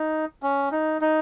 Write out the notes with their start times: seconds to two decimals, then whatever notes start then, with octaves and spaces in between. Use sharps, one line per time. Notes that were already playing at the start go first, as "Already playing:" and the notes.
Already playing: D#4
0.43 C#4
0.72 D#4
1.01 D#4